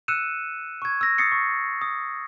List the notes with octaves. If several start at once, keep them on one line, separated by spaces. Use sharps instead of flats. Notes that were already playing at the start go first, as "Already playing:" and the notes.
E6 F#6 C#7 D#7 E7
C#6 G#6
E6 A#6
D#6 A6 C7 C#7
C#6
D#6